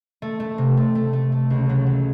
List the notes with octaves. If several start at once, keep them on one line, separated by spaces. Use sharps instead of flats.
A3
A3
C3
A3
A3
A3
A3
C#2
F#3
F#3